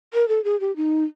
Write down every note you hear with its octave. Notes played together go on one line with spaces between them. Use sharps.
A#4
A4
G#4
G4
D#4